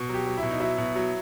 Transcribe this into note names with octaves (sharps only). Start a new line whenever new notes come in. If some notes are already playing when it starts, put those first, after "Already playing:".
Already playing: B2
F#3 G4
F#3
E4
B2
D#4
F#3 E4
B2
F#3